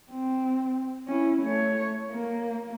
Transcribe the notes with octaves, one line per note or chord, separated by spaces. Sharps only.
C4
C#4 E4
A3 C#5
A#3